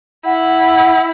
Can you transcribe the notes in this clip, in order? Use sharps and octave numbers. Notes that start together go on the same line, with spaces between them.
E4 F#5